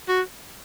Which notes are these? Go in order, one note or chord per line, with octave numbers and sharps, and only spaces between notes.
F#4